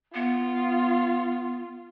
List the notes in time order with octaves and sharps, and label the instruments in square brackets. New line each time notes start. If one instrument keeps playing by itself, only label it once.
[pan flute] B3 [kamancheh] F4